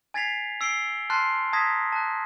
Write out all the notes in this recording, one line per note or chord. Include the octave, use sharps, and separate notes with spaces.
G#5 G#6 A6 B6 C7 F7
E6 C7 D7 G7
A5 C6 F6 F#6 A6 C7
A5 A#5 D#6 G#6 A#6 B6
A5 F#6